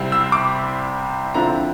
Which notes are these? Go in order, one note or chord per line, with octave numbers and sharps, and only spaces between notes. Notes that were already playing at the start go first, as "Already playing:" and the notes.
Already playing: C2 C3 G3 C4 E4
E6
D6
D3 F3 C4 E4 A#5